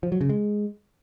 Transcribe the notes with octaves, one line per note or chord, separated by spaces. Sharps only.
F3
F#3
C#3
G#3